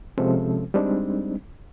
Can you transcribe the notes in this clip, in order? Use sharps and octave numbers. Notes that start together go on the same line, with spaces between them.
C3 F3 G#3 C4 C#4 A4
G3 G#3 C4 D4 D#4